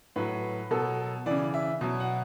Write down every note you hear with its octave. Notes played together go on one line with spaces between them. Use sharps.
A2 F#3 B4
B2 F#3 A4
C#3 E3 D5
E5
B2 F#3
F#5